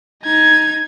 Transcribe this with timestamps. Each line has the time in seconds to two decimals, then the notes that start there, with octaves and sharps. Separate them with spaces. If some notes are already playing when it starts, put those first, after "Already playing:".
0.23 D#4 G#6